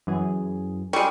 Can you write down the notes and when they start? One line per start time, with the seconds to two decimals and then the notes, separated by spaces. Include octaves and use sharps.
0.07 F#2 E3 G#4
0.93 G3 G#3 F4 C#6